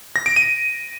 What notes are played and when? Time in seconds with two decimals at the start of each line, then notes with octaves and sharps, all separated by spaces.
0.16 A#6
0.26 D7
0.36 D#7